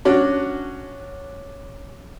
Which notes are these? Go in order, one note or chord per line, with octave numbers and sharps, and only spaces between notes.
C#4 D4 F#4